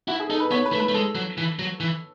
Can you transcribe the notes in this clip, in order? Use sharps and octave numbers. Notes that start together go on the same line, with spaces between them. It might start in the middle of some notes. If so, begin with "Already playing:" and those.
E4 F#4
G#4
D#4 A4
B4
B3 C#5
B4
A3
B4
A3
G#3 A4
F#3
E3
F#3
E3